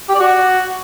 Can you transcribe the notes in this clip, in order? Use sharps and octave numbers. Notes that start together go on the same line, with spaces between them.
G4
D5
F#4